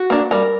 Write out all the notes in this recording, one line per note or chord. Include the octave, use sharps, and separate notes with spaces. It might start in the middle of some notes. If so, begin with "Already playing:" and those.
Already playing: F#4
A#3 D4
G3 A#4